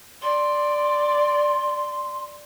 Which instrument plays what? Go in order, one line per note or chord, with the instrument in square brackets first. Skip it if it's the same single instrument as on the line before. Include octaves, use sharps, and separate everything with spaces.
[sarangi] D5 [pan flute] C6